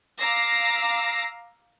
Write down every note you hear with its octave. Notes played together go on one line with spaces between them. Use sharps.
F5 A#5 D6 E6 A#6 C7